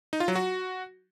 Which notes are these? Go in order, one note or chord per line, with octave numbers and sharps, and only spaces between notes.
D#4
F4
F#3
F#4